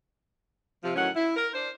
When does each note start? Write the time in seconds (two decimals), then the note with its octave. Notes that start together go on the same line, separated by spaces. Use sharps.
0.84 C3 F3
0.96 A2 D#3 F#3 C#4 F#5
1.16 E4
1.37 A#4
1.54 D4 C5